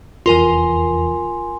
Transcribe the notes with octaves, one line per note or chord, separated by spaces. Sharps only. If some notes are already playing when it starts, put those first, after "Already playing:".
F1 E2 F4 A#4 G#5 C6